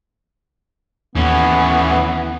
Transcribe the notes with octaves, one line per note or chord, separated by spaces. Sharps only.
D#2 E3 B3 C#4